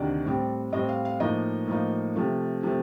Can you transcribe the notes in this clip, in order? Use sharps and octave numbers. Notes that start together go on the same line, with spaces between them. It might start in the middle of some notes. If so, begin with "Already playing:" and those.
Already playing: D2 C3 D#3 D4 D5
A2 G3 C4
A2 G3 C4 D#5
F5
F5
A2 F3 A#3 D#4 D#5
A2 F3 A#3 D#4
C3 F3 A3
C3 F3 A3